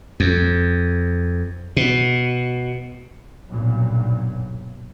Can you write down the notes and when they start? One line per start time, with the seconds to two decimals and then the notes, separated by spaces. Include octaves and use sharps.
0.20 F2
1.77 B2
3.50 B1 G2 A#2 F#3